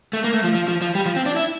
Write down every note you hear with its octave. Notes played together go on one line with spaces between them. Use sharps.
A3
A#3
A3
F3
F3
F3
F3
G3
F3
C4
D4
E4